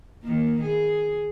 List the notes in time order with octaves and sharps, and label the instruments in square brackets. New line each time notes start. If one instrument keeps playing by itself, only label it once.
[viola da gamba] D#3 A#3
G#4